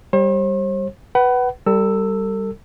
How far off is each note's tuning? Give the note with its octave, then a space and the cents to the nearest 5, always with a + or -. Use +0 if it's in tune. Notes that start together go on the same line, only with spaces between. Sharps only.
G3 +0 C5 +45
B4 +0 F#5 +30
G3 +0 A4 +40 E6 +0